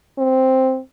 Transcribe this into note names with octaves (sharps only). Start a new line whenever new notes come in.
C4